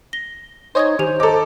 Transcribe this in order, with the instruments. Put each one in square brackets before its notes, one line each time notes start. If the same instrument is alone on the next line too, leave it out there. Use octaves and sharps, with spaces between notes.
[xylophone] A#6 G7
[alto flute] D#4 [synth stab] C5 C#5 D#5 [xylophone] G#5 D#6 G#6
[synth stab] D#3 [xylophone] G4 G#5 F7 [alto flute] C5
[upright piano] A4 D6 [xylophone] D#5 A#5